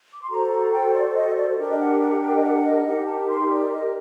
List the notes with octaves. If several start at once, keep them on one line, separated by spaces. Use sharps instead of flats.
D6
C6
F#4 A4 C5 A#5
A#5
G5
D5
D5
D#5
D5
D4 G4 A#4 D5
D#5
F#5
F#5
G5
D#5
F#5
D#5
D#4 G4 A#4 F#5
A5
C6
D5
D#5